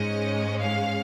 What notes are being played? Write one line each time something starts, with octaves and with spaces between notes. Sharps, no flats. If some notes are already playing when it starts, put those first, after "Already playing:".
Already playing: G#2 G#3 C#4 D#5
F5